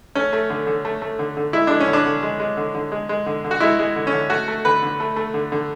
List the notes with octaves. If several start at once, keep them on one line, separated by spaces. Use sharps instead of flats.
A3 C#4
A3
D3
D3
A3
A3
D3
D3
G#3 E4
G#3 D4
C#4
D3
D4
D3
G#3
G#3
D3
D3
G#3
G#3
D3
D3
F#4
G#3 E4
G#3
D3
C#4
D3
A3 F#4
A3
D3 B4
D3
A3
A3
D3
D3